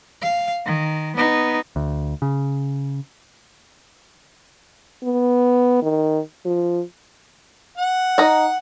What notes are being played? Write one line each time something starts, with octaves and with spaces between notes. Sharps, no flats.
F5
D#3
B3 D#4
D2
C#3
B3
D#3
F3
F#5
D#4 A#5